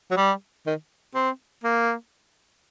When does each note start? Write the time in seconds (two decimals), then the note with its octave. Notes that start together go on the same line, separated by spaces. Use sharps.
0.11 F#3
0.17 G3
0.66 D#3
1.15 C4
1.64 A#3